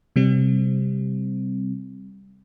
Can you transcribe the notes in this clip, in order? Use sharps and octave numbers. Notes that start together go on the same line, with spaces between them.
C3 G3 C4